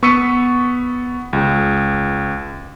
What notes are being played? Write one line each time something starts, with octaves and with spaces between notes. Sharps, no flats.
B3 C#6 E6 B6 C#7 D#7
C#2 G#4